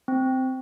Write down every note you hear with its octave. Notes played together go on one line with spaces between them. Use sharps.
C4